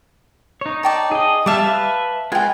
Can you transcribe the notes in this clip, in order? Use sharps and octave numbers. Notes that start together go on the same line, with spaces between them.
D#4 C#5
D5 G5 A5
G#4 D#5
G3 E5 F5 A5 D6
B4 E5
G#3 F4 B4 G5 G#5